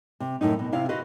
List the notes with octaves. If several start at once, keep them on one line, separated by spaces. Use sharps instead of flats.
C3
F#2 A2 A3 D#4
B2
C3 E4 F5
F#4 B4 C5 D#5 F5